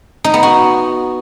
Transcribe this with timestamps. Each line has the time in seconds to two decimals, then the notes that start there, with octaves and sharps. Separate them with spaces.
0.24 D#4
0.34 B3
0.43 F#4